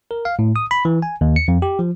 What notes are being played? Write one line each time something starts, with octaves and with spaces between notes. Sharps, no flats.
A#4
F5
A2
D#6
B5
E3
G#5
D#2
C#7
F2
G4
F3